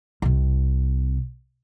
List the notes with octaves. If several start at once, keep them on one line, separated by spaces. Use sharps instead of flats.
C2 C3